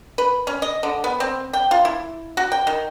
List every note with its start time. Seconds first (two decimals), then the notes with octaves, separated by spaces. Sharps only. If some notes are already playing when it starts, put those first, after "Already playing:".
0.18 B4
0.47 C#4
0.62 D#5
0.83 D3
1.04 B3
1.20 C4
1.53 G5
1.71 F4
1.85 E4
2.37 F#4
2.52 G5
2.67 D#3